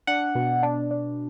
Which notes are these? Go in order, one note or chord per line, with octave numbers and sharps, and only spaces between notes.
D4 F#5
B2
D4
D4